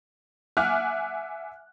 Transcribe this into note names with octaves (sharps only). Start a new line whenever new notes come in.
E5 F#5 G#5 D6 F6 F#6